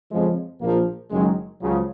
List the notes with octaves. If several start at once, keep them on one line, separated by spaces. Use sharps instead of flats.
F2 C#3 F3 G#3
A#1 A#2 F3 A#3
F#1 F#2 D#3 F#3 G#3
C#2 C#3 F3 F#3